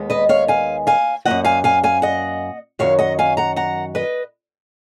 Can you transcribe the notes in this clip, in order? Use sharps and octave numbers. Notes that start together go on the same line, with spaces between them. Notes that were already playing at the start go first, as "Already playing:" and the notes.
Already playing: D#2 D#3 G#3 B3
B4 D#5
C#5 F5
F5 G#5
F5 G#5
F#2 F3 A#3 D#5 F#5
F5 G#5
F5 G#5
F5 G#5
D#5 F#5
F#2 D#3 F#3 C#5 F5
D#5 F#5
F5 G#5
F#5 A#5
F#5 A#5
B4 D#5